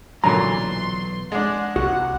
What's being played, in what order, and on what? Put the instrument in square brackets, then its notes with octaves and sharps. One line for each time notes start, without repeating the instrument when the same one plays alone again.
[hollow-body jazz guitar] B1 A#5 [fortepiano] A#2 D3 F#3 [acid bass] E3 [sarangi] C6
[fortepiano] G#3 D4 [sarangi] F#5
[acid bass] C2 [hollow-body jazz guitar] F#4 [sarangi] F#5